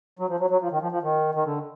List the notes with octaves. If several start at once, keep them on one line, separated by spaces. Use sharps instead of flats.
F#3
F3
F#3
F#3
F3
D#3
F3
F3
D#3
D#3
D3